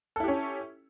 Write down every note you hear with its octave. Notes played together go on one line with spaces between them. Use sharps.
C#4 E4 G4 A4